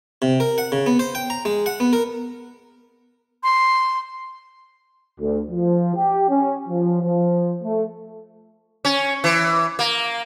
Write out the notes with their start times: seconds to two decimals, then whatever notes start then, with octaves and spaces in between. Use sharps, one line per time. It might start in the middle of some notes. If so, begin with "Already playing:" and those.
0.22 C3
0.40 A#4
0.58 F#5
0.72 C#3
0.86 B3
0.99 C5
1.15 G5
1.30 A#5
1.45 G#3
1.66 F#5
1.80 B3
1.93 A#4
3.43 C6
5.20 D2
5.51 F3
5.95 G4
6.29 C#4
6.69 F3
7.03 F3
7.63 A3
8.85 C#4
9.24 E3
9.79 A#3